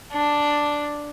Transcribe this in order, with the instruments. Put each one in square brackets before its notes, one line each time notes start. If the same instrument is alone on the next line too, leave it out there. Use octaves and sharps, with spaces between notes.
[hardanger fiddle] D4